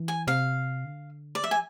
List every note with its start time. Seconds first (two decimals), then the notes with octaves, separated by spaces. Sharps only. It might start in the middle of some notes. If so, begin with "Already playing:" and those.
Already playing: E3
0.08 G#5
0.27 C3 F5
0.85 D3
1.35 D5
1.43 F3 E5
1.51 G#5